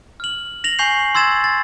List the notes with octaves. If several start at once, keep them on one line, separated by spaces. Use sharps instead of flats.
F6 F#7
A#6 F7 F#7
G#5 C#6 G6 C7 F7
C6 E6 G#6 A6 E7
A6